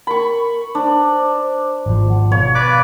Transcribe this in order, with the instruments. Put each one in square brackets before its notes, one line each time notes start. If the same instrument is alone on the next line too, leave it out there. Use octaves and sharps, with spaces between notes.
[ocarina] A#4 [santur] B5 C#6
[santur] D4 [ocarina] C5
[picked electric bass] G#1 F3
[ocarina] F#5
[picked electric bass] B2 [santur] C#5 [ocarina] F5
[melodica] B4 D5 D6